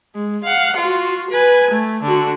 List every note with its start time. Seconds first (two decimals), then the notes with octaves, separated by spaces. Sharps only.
0.15 G#3
0.43 F5 F#5
0.76 F4 F#4
1.31 B4 G#5
1.71 A3
2.03 D3 F#4